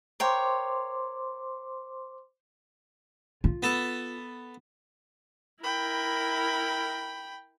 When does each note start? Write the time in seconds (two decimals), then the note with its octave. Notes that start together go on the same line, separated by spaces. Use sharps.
0.20 A#4 C5 C#5 G5 C6 D6
3.44 F4
3.63 B3 A4
5.64 E4 A#4 G5 B5